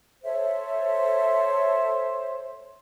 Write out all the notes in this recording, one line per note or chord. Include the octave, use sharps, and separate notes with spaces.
A4 C5 C#5 E5